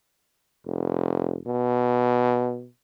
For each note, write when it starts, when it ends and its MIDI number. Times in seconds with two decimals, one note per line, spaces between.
0.66 1.38 29
1.46 2.67 47